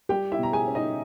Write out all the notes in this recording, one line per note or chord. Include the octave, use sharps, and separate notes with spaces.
G3 G4 G5
E4 E5
B2 A#5
G#4 G#5
C#4
D#4 D#5